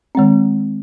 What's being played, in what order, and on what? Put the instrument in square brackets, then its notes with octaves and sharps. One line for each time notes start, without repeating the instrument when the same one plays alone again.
[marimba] D#3 G#3 C4